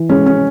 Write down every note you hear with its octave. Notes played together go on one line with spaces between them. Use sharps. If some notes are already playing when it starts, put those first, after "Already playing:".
Already playing: E3
G#3 C#4
C#4